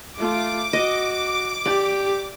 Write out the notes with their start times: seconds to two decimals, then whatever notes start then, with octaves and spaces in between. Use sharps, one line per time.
0.18 A3 F4 D6
0.73 F#4 D#5
1.65 G4 D5